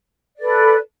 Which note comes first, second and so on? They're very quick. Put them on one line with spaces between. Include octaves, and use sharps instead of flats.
D5 A4 B4